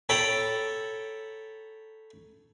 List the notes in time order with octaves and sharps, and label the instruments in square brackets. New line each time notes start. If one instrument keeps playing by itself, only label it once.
[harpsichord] A4 C#5 G5 A#5 B5